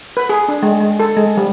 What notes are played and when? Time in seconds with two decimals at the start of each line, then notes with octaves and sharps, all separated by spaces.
0.17 B4
0.29 G#4
0.48 D4
0.63 G#3
0.80 G#3
1.00 A4
1.17 G#3
1.37 G3